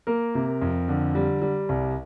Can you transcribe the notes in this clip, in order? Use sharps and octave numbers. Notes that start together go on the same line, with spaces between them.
A#3 A#4
C3
F2
D3
G3
G3
C2